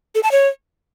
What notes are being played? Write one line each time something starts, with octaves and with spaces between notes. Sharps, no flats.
A4
A5
C#5